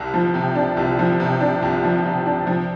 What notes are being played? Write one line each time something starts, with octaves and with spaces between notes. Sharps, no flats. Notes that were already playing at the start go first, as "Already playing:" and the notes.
Already playing: C2
F3
C3
D4
C2
F3
C3
D4
C2
F3
C3
D4
F3